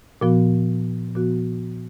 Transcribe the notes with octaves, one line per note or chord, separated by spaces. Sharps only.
A#2 F3 B3 F#4
A#2 F3 B3 F#4